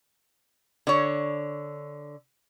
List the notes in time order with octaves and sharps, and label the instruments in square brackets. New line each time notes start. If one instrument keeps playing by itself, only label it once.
[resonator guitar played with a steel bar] D3 C#5